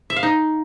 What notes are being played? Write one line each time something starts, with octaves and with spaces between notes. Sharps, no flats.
E5
F5
D#4